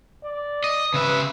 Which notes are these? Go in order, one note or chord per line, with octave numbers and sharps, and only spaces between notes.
D5
D#5
C#3 B4 E5